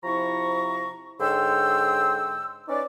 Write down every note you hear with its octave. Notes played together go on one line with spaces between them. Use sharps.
C3 F3 E4 A#5 C#6
G#2 D3 C#5 G5 C6 E6
C#4 D#4 B4 D5